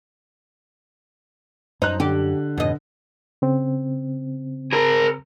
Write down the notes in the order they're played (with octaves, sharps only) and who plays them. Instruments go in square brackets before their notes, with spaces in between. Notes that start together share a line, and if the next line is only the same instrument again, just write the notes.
[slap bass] F#2 [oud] D#4 [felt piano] C5 F#6
[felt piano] D3 [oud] G4
[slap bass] F2 G#2 [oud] B2 D#5
[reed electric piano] C#3 C4
[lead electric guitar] G#4 A#4